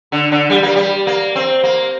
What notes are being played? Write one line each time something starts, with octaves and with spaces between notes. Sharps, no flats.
D3
D3
G3
A#3
G3
A#3
C4
A#3